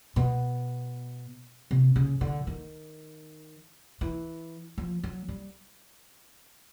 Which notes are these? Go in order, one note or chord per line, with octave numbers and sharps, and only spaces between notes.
B2
C3
C#3
D3
D#3
E3
F3
F#3
G3